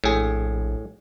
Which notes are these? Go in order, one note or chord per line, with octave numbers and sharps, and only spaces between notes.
A#1 A2 G#4